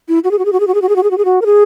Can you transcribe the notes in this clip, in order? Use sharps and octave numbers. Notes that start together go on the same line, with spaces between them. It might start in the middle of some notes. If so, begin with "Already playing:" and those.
E4
F#4
G#4
F#4
G#4
F#4
G#4
F#4
G#4
F#4
G#4
F#4
G#4
F#4
G#4
F#4
A#4
G#4